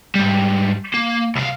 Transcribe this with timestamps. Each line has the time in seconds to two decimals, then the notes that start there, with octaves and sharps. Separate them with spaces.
0.15 G#2 G3
0.94 A#3
1.35 C2 F5